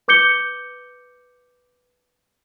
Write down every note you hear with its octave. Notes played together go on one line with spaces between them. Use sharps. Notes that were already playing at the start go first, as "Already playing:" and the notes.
B4 D6 G6 C#7 G7